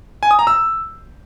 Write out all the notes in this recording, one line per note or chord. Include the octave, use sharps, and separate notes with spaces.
G#5
D#6
A#5
E6